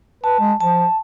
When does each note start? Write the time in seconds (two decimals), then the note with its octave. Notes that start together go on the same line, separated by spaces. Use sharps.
0.24 B4 A5
0.40 G#3
0.61 F3 A5